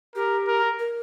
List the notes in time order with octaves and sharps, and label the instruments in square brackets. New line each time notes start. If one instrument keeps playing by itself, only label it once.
[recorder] G4 [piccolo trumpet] A#4
[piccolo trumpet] A#4
[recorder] A#4